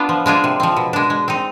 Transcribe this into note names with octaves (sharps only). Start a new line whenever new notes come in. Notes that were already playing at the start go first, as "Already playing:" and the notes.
Already playing: B3 D4 F4
F3
G#3 D4 F4 G#4
C3
F3 C4
B2
G#3 D4
G#3
C4 D#4